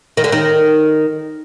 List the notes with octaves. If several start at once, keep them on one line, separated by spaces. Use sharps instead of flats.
D#3
D3
D#3